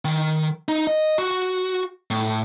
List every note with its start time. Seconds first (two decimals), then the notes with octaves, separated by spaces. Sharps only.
0.05 D#3
0.68 D#4
0.87 D#5
1.18 F#4
2.11 A2